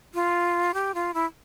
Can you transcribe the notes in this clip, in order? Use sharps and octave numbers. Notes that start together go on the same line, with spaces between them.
F4
G4
F4
E4